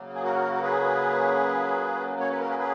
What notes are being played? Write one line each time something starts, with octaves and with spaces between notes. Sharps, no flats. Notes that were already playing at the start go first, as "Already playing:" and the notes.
Already playing: C#3 F#3 A#3
G#4
F#4 A#4
A#4
G#4 B4
C#5
B4
A#4
G#4 B4
G#4 B4